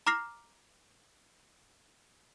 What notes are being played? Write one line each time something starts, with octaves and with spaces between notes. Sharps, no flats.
A#5 D6 F6 A#6 C7 F7